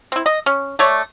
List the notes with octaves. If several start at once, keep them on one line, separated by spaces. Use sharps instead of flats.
C4 E4
D#5
C#4
A3 C#5 D5